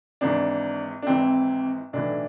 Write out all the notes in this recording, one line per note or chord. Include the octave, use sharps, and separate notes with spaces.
G#1 G#2 E3 D4
D4
G#1 G#2 E3 C4
B1 A2 E3 D4